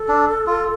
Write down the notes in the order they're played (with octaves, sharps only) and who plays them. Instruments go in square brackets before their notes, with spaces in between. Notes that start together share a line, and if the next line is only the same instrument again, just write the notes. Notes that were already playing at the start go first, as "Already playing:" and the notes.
Already playing: [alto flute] A4
[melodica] D4
F4